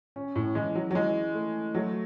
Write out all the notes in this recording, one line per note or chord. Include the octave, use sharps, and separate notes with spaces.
C#4
A2
E3 G#3
F#3
F#3
E3 G#3
A3
F#3 A3